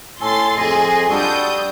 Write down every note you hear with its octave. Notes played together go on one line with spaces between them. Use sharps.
A2 C#4 A4 C6 A6
F2 G#4 D#5 C6
G3 D4 F#4 A4 D#6 G6